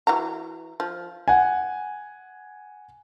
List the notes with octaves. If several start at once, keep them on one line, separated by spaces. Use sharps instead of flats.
E3 F#4 A#5
F3
F#5 G#5